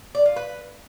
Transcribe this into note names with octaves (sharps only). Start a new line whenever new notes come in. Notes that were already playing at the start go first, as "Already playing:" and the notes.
D5
F4
B4